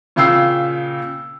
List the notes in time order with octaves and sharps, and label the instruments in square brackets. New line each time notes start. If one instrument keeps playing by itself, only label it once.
[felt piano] A#2 C#3 F5 G5 E6 C7